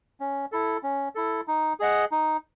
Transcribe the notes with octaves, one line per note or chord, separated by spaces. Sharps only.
C#4
E4 A4
C#4
E4 A4
D#4
G#4 D#5 F#5
D#4